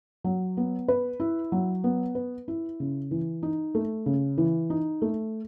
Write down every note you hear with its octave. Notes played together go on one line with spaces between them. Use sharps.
F#3
B3
B4
E4
F#3
B3
B4
E4
C#3
E3
D#4
A3
C#3
E3
D#4
A3